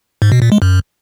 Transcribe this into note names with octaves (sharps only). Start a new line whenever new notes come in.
G#2
B2
A#2
G#3
F#2